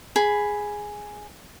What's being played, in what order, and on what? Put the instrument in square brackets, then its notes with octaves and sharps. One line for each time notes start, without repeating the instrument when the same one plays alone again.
[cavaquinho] G#4 B5